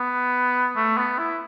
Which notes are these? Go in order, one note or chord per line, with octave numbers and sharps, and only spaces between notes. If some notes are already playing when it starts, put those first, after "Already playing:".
Already playing: B3
A3
B3
E4